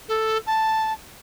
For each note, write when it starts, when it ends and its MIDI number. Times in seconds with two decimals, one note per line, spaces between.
0.08 0.38 69
0.46 0.93 81